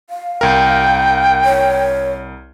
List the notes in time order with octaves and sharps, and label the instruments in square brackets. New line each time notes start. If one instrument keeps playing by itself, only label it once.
[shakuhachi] F5
[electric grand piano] C2 A#4 [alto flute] G5
[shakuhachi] C#5